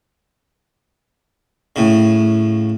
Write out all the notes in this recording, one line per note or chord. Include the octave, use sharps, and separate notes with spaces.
A2 C#3